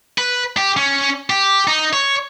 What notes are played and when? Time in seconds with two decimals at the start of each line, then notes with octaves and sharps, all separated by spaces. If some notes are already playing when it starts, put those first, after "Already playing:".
0.18 B4
0.57 G4
0.77 C#4
1.30 G4
1.68 D#4
1.93 C#5